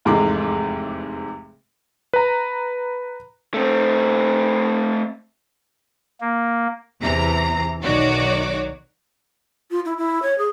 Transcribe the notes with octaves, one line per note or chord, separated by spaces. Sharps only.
F1 E2 G#2 C3 G#3 D6
B4 A#5
A3 C4
A#3
E2 C3 E3 A#5
B1 D#3 F#4 C#5 D5 D6
F4
E4
E4
C#5
G#4